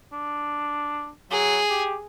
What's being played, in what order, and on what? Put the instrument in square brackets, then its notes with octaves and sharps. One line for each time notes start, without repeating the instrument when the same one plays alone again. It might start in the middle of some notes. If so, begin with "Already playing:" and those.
[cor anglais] D4
[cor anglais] F#3 [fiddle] G#4
[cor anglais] G4